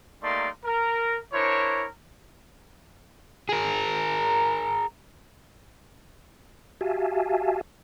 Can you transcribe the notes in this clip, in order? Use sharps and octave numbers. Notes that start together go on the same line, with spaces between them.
G3 A3 A#3 D#4 D5 C6
A#4
D4 E4 A#4 C5 C#5
G#4 A#4
F#4 G4 E5 F5 G#5 A5